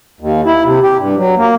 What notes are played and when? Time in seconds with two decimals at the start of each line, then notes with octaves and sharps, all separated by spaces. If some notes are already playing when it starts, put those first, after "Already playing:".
0.21 D#2
0.45 E4
0.64 C3
0.83 G4
0.98 G2
1.17 F#3
1.37 A#3